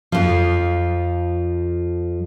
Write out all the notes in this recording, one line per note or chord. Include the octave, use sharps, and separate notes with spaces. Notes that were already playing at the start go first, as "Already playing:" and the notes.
F2 F3